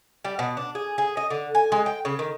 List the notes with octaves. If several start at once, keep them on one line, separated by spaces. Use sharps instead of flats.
G3
B2
D4
G#4
G#4
D#5
D3
G#5
G#3
G5
C#3
D#3